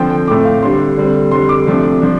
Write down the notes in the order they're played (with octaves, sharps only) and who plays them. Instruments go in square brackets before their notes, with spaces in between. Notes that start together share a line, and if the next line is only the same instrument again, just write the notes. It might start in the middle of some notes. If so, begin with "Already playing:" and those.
Already playing: [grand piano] D3 F3 C4 G5
G5
A2 A3 C4 D6
F5
D3 G3 D4 C6
D3 G3 C4
F2 D3 G3 C6
D6
C3 F3 A3 D4
F3 D4